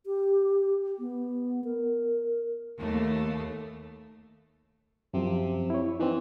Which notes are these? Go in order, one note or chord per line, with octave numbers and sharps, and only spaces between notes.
G4
B3
A#4
D#2 A3
F#2 C3 F3
E4 C#5
E3 C4 D#4